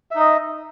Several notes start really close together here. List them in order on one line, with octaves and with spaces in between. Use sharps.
E5 D#4 D#5